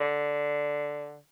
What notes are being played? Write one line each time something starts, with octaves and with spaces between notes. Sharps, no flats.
D3